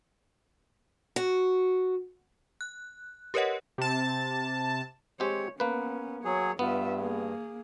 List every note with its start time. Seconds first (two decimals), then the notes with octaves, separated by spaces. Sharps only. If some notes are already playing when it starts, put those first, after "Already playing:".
1.16 F#4
2.61 F#6
3.34 G4 A#4 B4 C#5 D#5 F#5
3.78 C3 A5
5.20 G#3 C4 G4 C#5
5.60 A#3 B3 C#4 B4
6.25 F#3 G#4 C#5
6.59 G2 B3 F4 E5
7.00 A#3 G#4